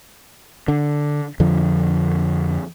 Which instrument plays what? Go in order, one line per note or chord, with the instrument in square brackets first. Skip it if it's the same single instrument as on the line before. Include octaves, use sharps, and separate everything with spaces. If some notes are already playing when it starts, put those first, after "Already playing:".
[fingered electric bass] D3
F2 D3 F3